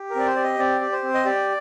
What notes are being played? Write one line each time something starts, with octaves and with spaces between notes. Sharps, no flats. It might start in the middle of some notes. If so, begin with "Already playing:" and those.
Already playing: G4
A#4
C4 D5
C5
G4 D5
D#5
C4 D5
G4
C5
C4
D#5
G4 D5